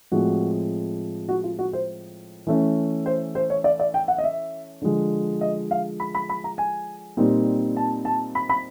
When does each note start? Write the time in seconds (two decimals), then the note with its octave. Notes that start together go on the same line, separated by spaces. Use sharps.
0.12 A2 F3 G#3 C4 F#4
1.29 F#4
1.44 F4
1.59 F#4
1.73 C5
2.47 E3 A3 C#4
3.06 C5
3.35 C5
3.50 C#5
3.64 D5
3.80 D5
3.94 G5
4.08 F#5
4.18 D#5
4.24 E5
4.82 D3 F3 G#3
5.41 D#5
5.71 F5
6.00 B5
6.15 B5
6.29 B5
6.44 A#5
6.58 G#5
7.17 A#2 G3 C4 D#4
7.77 A5
8.05 A5
8.35 B5
8.49 B5